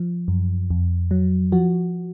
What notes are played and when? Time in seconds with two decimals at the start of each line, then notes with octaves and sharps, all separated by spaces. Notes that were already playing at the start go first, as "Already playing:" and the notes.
Already playing: F3
0.28 F#2
0.70 F2
1.11 F#3
1.52 F3 F#4